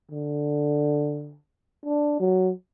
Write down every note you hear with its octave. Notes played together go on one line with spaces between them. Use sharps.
D3
D4
F#3